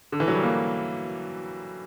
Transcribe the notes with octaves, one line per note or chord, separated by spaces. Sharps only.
D3
E3
F#3
G3
A#3